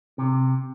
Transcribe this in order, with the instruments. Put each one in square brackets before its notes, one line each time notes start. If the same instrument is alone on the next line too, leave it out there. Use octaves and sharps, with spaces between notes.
[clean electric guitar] C3